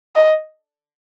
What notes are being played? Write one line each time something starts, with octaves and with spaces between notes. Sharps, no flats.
D#5